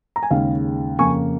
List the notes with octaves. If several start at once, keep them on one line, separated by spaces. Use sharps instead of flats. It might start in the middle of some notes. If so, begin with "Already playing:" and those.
A#5
G#5
D#2 C#3 G#3 F5
F2 C#3 A#3 G#5 C#6